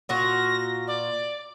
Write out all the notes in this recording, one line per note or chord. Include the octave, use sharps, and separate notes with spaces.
A#2 F4 F#4 A#6
D5